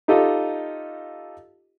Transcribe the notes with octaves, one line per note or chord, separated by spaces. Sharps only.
D#4 F4 G4 A4 D#5 F5